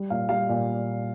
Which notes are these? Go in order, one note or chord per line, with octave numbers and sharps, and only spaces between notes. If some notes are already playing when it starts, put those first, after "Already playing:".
Already playing: G3
A#2 F5
G3 F5
A#2